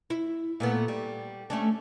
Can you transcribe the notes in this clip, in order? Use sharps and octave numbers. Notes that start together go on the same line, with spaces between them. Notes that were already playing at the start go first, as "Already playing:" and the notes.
E4
A#2 A3 B3
G3
A3 C#4 D4